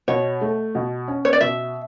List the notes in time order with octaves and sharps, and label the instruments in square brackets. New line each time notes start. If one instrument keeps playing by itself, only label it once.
[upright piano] B2 [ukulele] C#5
[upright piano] A3
B2
C#4
[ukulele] C#5
D5
[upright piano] B2 [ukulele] E5